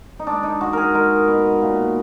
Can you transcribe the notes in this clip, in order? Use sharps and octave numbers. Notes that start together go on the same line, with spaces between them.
D#4
G#3 D4
D#4
G#3 F#4
G#4 A#4
G#3 A#4
B2
A#2